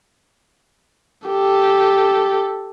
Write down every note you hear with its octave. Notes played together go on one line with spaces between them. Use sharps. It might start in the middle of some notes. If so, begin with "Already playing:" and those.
G4 A4